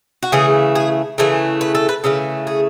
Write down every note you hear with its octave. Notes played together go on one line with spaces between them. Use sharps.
F#4
C#3 E3 A3 G#4
G#4
C#3 E3 A3
B4
A4
B4
C#3 E3 A3 A4
G#4